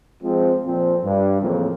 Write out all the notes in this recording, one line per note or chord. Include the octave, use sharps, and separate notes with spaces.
F3 G#3 C4
F2 A#2 F3 C4
G2
F2 A2 C#3 E3 A#3 C4